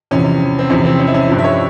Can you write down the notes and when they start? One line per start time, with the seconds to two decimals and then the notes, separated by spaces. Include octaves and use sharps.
0.11 E2 C3 F3 C#4
0.59 C4
0.70 E2 C3 F3 C#4
0.85 C4
1.00 C#4
1.07 E4
1.14 C#4
1.29 G2 F3
1.38 E5
1.44 C#5